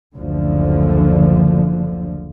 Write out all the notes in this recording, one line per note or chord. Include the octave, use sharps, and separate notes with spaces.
F#1 D2 D3 F3